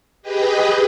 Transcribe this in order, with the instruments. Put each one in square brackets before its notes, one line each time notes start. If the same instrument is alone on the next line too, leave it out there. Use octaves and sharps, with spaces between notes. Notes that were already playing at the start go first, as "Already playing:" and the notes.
[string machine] G4 G#4 B4 D#5 G5